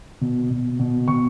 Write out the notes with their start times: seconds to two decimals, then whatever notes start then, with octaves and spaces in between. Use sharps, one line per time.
0.21 B2
0.50 B2
0.79 B2
1.08 B2 C#6